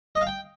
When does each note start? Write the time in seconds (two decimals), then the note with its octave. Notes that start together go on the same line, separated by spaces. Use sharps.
0.15 D#5
0.21 F5
0.27 G5